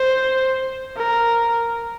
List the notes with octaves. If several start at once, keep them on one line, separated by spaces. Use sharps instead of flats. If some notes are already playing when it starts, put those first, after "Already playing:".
Already playing: C5
A#4